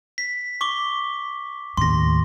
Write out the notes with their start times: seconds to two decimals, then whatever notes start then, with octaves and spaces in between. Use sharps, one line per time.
0.18 B6
0.61 C#6 D6 G7
1.77 D#2 A2 C6 A#6